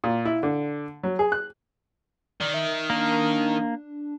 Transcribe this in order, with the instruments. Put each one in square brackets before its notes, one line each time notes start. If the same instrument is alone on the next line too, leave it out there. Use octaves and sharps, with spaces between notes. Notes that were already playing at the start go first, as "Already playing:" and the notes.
[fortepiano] A#2
E4
D3
F#3
G#4
F#6
[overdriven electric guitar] D#3 [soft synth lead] D5
[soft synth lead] E5
[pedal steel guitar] A#3 [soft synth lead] D4